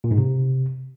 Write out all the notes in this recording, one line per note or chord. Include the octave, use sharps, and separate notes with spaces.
A#2
G#2
C3